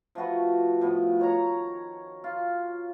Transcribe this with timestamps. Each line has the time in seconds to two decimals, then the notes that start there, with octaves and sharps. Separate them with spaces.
0.15 F3 A3 F#4 B4
0.81 A2 F3 B3
1.19 D#3 C#5 A#5
2.24 F4